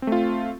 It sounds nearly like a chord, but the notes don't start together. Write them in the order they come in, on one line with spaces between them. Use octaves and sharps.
C4 A3 F4